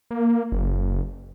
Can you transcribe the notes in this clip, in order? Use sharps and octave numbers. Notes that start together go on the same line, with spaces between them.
A#3
F#1